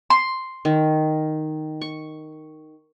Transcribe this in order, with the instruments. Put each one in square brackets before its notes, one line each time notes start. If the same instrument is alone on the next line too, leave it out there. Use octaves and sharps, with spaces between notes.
[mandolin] C6
[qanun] D#3
C#6